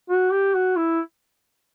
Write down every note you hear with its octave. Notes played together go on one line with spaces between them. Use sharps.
F#4
G4
F#4
E4